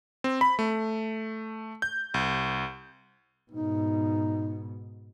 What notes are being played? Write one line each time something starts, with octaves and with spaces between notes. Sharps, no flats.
C4
B5
A3
G6
C2
G#2 B2 D#4